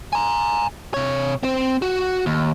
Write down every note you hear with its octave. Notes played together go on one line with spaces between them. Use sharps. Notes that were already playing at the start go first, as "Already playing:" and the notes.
G#5 A#5
C3 C#5
C4 C5
F#4
D#2